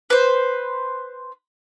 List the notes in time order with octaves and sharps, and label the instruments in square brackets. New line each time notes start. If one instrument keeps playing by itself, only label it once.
[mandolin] B4 C5